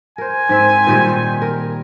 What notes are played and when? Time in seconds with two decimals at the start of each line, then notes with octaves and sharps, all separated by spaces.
0.18 A#4 C5 G#5
0.49 G#2 C4 E5
0.87 A#2 D#3 G3
1.42 A#4